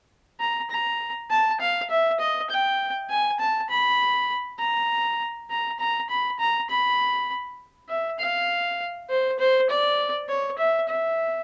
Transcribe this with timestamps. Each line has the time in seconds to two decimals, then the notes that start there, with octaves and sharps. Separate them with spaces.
0.40 A#5
0.70 A#5
1.30 A5
1.60 F5
1.90 E5
2.20 D#5
2.50 G5
3.10 G#5
3.40 A5
3.69 B5
4.59 A#5
5.50 A#5
5.79 A#5
6.09 B5
6.39 A#5
6.69 B5
7.89 E5
8.19 F5
9.09 C5
9.39 C5
9.70 D5
10.29 C#5
10.58 E5
10.88 E5